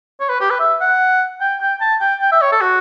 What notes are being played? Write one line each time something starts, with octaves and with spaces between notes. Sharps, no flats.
C#5
B4
G4
B4
E5
F#5
G5
G5
A5
G5
G5
E5
C#5
A4
F#4